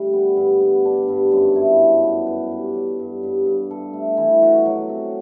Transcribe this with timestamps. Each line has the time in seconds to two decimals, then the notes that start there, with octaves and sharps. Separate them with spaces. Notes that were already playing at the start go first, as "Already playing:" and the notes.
Already playing: D3 G3 A3
0.13 B3
0.37 G2
0.61 B3
0.85 D4
1.09 G2
1.31 F#2
1.55 E4
1.80 D4
2.03 B3
2.27 B4
2.51 G4
2.74 F#3
2.99 G2
3.23 G2
3.46 G2
3.71 A4
3.93 A3
4.17 E3
4.42 F#4
4.66 F#3
4.89 C4